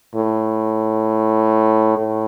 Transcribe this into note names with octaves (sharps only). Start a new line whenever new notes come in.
A2
A2